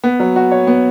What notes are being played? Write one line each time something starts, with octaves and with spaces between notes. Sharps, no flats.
B3
F#3
F#4
C#5
B3